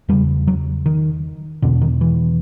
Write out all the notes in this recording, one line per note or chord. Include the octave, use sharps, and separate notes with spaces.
E2 C#3 G3
F#3
D#3
E2 B2 D3
D#3
E3